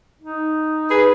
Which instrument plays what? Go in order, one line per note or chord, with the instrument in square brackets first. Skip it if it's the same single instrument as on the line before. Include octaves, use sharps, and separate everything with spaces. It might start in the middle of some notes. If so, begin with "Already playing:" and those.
[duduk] D#4
[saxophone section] G#4 B4